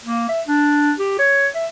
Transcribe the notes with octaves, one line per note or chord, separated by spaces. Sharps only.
A#3
E5
D4
G4
C#5
E5